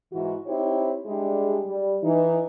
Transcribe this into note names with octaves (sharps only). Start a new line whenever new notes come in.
G#2 E3 E4 F#4
C4 D#4 E4 G4 C5 C#5
G3 G#3 D4 E4 G4 G#4
G3
E3 D#4